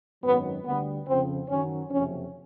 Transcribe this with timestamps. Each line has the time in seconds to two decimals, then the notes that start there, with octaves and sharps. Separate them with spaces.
0.23 G#1 F#2 D#3 F#3 B3
0.64 D2 D3 G3 B3
1.07 F2 C#3 F3 C4
1.48 F#2 D#3 F#3 C#4
1.90 F#1 F2 C3 F3 C#4